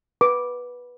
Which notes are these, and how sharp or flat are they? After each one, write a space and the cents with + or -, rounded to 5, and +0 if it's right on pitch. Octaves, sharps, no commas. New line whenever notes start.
B4 -10 D6 +0